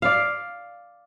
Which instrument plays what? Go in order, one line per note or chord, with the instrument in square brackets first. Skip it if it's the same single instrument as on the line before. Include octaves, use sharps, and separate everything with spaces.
[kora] D5 F5